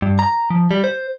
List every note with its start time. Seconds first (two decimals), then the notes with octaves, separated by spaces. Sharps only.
0.02 G2
0.19 A#5
0.50 F3
0.71 G3
0.84 C5